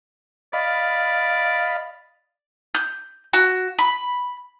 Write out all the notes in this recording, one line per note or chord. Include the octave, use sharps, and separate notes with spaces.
D5 D#5 F5 B5
G6
F#4
B5